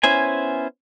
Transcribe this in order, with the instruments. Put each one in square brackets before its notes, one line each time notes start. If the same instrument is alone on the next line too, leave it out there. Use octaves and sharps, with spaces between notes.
[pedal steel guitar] B3 C#4 E4 C5 G#5